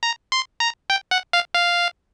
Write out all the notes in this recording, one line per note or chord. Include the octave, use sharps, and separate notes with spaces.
A#5
C6
A#5
G5
F#5
F5
F5